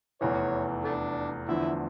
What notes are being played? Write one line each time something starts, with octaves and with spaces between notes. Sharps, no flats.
F1 E2 E3 C#5
A3 D4
E2 D3 F3 A3 E4